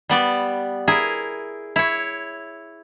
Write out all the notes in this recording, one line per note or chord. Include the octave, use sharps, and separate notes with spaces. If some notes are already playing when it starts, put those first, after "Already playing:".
G3 B3 D5
E4 G#4 A#4
E4 C#5